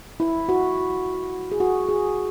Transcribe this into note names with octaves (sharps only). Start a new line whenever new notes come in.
E4
F#4
G#4
F#4
G#4